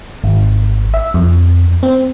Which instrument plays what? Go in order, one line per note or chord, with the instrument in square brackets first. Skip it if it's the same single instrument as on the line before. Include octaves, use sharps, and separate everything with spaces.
[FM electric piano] G#1
E5
F2
C4